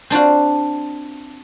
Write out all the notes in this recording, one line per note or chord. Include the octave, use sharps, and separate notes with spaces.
C4 D4 F4 F#4